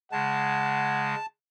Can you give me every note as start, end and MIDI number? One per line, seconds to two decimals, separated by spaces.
0.12 1.15 49
0.12 1.15 56
0.12 1.15 78
0.12 1.26 81